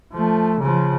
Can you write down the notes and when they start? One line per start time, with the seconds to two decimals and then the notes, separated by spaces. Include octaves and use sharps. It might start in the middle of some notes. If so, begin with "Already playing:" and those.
0.13 F3 A3
0.60 C#3 F3